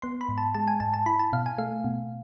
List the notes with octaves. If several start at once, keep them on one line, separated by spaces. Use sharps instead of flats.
B3 C6
B5
G#2
A5
G#3 A5
G#5
G#2 A5
A5
E4 B5
A5
B2 F5
G#5
A3 F5
B2